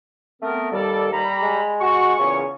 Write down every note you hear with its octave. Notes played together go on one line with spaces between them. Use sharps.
A3 B3 C4 A#4
D#2 G3 A4 D5
G3 A#5 B5
G#3
F#4 C#6
E2 A#2 C#3 C#4